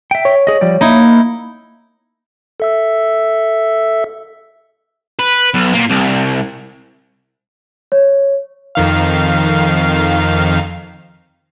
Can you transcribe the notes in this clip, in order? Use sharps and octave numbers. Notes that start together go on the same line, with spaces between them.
E5 G5
C#5
G#4 D#5
F3 G3 D5
A#3 D#4 E4
A4 E5 E6
B4
B1
A#2 A#3
C2
C#5
F2 D#3 F5